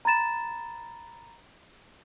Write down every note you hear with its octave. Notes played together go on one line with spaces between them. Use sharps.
A#5 B5 A6 E7